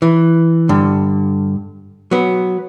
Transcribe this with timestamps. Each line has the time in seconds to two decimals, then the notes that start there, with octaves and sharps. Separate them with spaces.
0.02 E3
0.69 G2 D3
2.11 F#3 B3